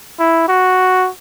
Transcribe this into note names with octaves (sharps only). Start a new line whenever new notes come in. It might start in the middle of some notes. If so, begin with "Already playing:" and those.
E4
F#4